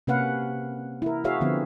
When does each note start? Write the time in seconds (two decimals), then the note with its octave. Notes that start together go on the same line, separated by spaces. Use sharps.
0.07 C3 A#3 C#4 B4 F5 F#5
1.02 E4 A#4
1.24 F#4 G#4 C#5 E5 F5
1.41 D3 F3 B3 C4